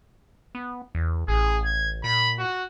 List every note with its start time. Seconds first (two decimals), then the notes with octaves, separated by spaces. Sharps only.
0.55 B3
0.95 E2
1.28 A1 G#4
1.65 G#6
2.04 A#2 B5
2.39 F#4